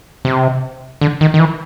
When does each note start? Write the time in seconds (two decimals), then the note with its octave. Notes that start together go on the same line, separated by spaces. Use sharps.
0.25 C3
1.01 D3
1.21 D#3
1.34 D#3
1.39 E3